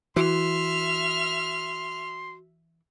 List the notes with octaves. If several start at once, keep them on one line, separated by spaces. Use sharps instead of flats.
E3 F#4 E5 C6 F6